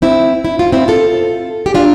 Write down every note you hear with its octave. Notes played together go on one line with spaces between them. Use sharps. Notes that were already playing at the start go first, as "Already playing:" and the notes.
C4 E4
E4
F4
C4 E4
F4 A4
G4
D4 F4